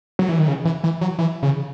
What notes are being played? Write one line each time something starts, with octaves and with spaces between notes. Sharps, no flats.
F#3
E3
D#3
C#3
E3
E3
F#3
E3
C#3